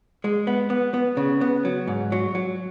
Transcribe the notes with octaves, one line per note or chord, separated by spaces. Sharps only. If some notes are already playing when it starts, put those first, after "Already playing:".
G#3
B3
B3
B3
C#3
B3
F#3
G#2
F#3
F#3